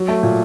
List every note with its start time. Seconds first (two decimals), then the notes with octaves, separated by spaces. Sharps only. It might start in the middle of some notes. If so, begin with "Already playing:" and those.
Already playing: F#3
0.08 A3
0.23 A#2